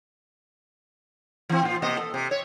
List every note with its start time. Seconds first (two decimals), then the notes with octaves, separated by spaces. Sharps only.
1.49 E3 C4
1.63 A#2 F4
1.82 C3 A#3 D#5
1.98 A4
2.14 C3
2.31 C#5